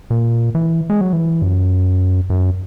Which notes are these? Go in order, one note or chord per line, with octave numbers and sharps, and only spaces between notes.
A#2
E3
G#3
F#3
E3
F#2
F#2